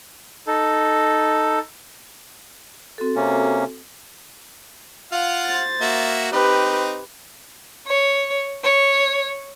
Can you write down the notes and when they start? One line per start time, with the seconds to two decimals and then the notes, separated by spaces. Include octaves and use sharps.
0.47 D#4 A4
2.98 C4 F#4 A4
3.16 C3 A#3 C#4
5.12 F4 F5 F#5
5.46 C5 A6
5.81 A#3 F#4 E5
6.32 C4 D#4 G4 B4
7.86 C#5
8.63 C#5